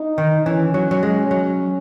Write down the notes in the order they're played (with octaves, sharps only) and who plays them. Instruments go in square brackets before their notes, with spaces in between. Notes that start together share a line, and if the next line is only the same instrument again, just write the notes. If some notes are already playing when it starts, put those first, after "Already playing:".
Already playing: [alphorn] D#4
[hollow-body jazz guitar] D#3
[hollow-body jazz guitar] E3 [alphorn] C#4
[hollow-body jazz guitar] F#3
F#3
G#3
F#3